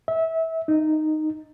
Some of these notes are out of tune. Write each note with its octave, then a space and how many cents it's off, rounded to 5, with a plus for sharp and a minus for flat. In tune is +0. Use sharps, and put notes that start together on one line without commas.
E5 -25
D#4 -10